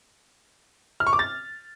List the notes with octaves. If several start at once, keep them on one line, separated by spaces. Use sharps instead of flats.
F6
C#6
D6
A6